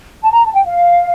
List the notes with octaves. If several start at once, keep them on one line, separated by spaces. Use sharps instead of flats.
A5
A#5
A5
G5
F5